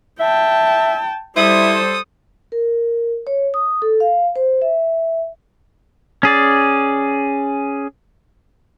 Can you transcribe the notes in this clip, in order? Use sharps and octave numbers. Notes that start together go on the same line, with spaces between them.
E5 G5 A5
G3 E4 A4 C5 D#6
A#4
C#5
D#6
A4
F5
C5
E5
C#4 G#4 D5